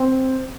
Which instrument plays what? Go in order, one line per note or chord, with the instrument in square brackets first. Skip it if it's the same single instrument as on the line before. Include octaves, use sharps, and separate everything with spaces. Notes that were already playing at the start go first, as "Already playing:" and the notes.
Already playing: [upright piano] C4